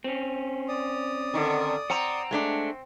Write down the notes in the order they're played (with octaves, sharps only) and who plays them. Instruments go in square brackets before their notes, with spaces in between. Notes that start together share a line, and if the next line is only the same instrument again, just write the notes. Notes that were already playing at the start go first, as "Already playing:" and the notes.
[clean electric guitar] C4 C#4
[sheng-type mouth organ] D5 D#6
[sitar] D3 D#3
[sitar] C4 [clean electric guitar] F#5 A#5
[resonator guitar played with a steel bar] G#3 A3 D4